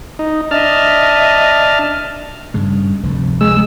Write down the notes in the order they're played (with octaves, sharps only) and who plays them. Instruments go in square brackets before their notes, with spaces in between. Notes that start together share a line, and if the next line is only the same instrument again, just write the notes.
[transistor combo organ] D#4
[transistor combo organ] D4 A5 F6 [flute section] D#5 E5
[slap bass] G2 C#3 G#3
F1 D2
[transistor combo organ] G#3 E6